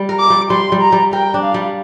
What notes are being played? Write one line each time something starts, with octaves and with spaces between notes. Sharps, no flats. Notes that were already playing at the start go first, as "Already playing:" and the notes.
Already playing: G3
A#4
D6
G3
G3 C6
G3
A#5
G3
A#4 G5
D4
F5
G3